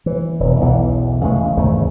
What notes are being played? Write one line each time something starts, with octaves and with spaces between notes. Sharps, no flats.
E3
E1
B1 E2 E3
C#3 E3 G#3 A3
G#1 E2 C#3 A3